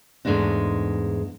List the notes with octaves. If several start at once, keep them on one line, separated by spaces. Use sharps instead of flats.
E2 G#2 G#3 A3 D4 D#4